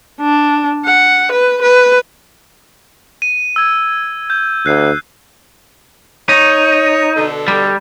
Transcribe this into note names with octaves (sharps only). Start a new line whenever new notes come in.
D4
F#5
B4
B4
D#7
E6 G#6 D#7
G6
D2 F#6 C7
D#4 C#5
B2 D3 A4
G3